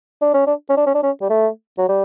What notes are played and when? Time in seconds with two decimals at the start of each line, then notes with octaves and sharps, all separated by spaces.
0.21 D4
0.34 C#4
0.47 D4
0.69 C#4
0.77 D4
0.87 C#4
0.94 D4
1.03 C#4
1.21 G3
1.30 A3
1.78 F#3
1.89 G3